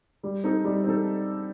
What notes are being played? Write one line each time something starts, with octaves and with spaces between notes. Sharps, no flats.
G3
C4 D#4 A4
G3
C4 D#4 A4